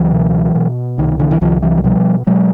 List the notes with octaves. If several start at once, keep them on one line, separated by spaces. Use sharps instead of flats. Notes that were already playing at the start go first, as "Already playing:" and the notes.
Already playing: C#2 E3 F#3
B2
B2
C2 D#3
D3 E3
E3
C2 D#3 F3
E3 F#3
F#3
B2 F3 G3
B2 F#3 G#3